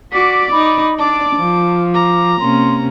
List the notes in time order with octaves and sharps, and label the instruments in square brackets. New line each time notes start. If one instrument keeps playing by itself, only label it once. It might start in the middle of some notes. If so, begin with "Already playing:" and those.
[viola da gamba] F#4 [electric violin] D5 D6 [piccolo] B6
[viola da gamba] D#4 [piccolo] B5
[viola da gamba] D4 D5 [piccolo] A5 [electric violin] D6
[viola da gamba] F3
[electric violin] A#5 [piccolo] D6
[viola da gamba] C3 A#3 C#4 [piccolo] C6